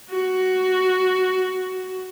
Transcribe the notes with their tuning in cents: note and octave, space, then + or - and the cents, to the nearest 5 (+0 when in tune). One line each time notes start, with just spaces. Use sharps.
F#4 +5